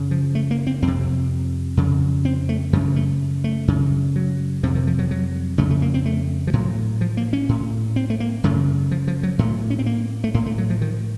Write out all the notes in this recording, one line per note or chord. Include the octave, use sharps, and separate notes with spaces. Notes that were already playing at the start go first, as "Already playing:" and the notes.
Already playing: F#2 C#3
F3
A3
A#3
C4
F2 C3 C4
F2 C#3
C4
A3
F#2 C#3 F3
A3
A3
F#2 C#3
F#3
F2 C3 F3
D#3
F3
F#3
F#3
F2 C#3 A3
A3
A#3
C4
A3
F3
A2 F#3
F3
A#3
C#4
A2
C4
A3
A#3
F#2 C#3 A3
F3
F3
F#3
A2 A3
C#4
C4
A#3
A3
A2 A#3
A3
F#3
F3
D#3